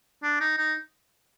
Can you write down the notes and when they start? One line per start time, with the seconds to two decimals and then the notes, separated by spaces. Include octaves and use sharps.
0.23 D4
0.40 D#4
0.58 D#4